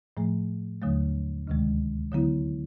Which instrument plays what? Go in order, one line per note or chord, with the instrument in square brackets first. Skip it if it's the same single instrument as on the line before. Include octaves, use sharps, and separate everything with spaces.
[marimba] A2 F3 A3
D#2 D3 F#3 A3
D2 C3 D#3 G#3
D3 F#3 B3 E4